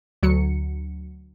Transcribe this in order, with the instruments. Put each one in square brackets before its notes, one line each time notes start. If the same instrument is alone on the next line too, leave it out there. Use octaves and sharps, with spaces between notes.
[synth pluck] D2 F#3 C#7